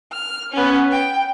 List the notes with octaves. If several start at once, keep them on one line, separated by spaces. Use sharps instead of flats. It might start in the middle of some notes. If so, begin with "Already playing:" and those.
F6
B3 C#4
G5